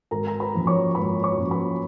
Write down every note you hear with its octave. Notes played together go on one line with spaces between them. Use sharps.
G#1 A#4 A#5
A#5
B4 B5
F#2 F3 A#3
C#5 C#6
G#1 B4 B5
C#5 C#6
F#2 F3 A#3
B4 B5